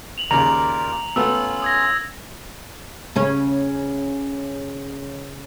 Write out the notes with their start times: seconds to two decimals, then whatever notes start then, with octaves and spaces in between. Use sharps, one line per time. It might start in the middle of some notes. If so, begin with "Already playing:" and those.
0.18 F7 F#7
0.31 D#2 C#3 F4 A#4 D5 A#5 F7
1.16 A3 B3 C#4 F4 E6
1.62 D#6 G#6 A#6
3.16 C#3 C#4 C#5